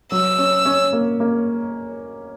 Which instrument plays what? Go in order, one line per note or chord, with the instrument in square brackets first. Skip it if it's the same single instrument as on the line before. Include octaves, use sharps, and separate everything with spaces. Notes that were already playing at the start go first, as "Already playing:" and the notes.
[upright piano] F#3 [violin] E6
[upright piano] C#4
C#4
A#3
A#3